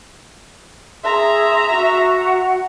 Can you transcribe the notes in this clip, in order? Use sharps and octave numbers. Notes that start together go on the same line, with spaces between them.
G#4 E5 A#5 C6
F#4 F#5